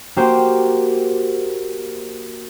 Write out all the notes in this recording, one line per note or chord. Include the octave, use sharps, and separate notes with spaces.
A#3 F#4 G4 C5